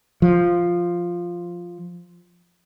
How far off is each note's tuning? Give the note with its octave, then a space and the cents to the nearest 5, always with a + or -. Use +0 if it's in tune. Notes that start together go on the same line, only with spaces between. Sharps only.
F3 +0